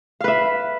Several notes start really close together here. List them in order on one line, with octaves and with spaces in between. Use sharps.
F5 B4 E5